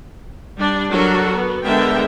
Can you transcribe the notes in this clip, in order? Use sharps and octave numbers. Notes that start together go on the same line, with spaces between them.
G3 D4 D5
F#3 D4 F#4 A4 A#4
B3
D3 G#3 B3 A#4 E5 G5